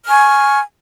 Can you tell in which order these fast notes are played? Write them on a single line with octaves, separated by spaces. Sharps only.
F6 G#5 C#6